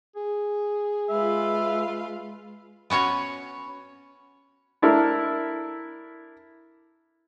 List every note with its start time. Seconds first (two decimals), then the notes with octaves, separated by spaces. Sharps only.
0.16 G#4
1.09 G#3 F4 B4 E5 F5
2.90 B3 C#4 F#4 C#5
4.82 D4 E4 A4 A#4